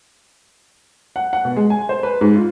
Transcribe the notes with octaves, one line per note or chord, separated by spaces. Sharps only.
F#5
F#5
B2
G#3
G#5
C5
B4
G#2
F4